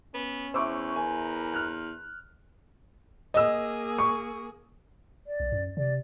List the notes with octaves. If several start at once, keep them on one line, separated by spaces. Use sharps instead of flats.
B3 C#4
E2 C5 E5 C#6 D6 E6
A#4 G#5
F6 F#6
A#3 G#4 D#5 E6
C#6
D5
B1
F#2
C3 D5